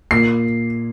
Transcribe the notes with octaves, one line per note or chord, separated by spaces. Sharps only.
A#2 C7